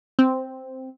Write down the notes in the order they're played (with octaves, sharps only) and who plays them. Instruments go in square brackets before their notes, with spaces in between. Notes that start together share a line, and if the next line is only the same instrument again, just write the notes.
[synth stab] C4